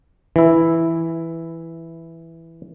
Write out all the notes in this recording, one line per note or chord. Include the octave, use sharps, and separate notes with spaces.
E3 E4